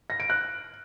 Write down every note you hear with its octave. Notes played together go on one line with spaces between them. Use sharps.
A#6
D7
F#6